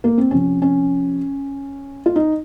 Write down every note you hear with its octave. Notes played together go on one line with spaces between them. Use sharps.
A#3
C4
C3 F3 C#4
C#4
F4
D#4